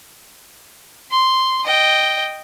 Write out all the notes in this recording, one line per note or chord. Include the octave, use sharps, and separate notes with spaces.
C6
D#5 G5